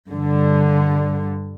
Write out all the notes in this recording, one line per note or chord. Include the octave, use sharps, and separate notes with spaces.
G2 D3